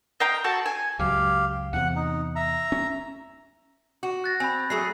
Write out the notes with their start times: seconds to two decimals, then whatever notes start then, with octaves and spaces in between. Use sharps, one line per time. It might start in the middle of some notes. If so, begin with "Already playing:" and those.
0.20 D#5 F5 G5 A#5
0.44 F#4 A4 A5
0.66 G#5
0.99 C#2 F#2 G4 F5
1.73 E2 C3 F#5
1.96 D#4
2.36 E5 A#5
2.72 C#4
4.03 F#4
4.24 F#6 A6 A#6
4.40 C4 G#5 B5
4.70 F#3 A3 G#4 C7